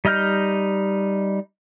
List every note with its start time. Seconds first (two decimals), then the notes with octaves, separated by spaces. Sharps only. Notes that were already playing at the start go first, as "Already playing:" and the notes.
0.05 G3 D#4 D#5 F6 G6